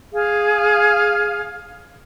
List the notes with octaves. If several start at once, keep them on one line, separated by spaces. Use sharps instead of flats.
G#4 F5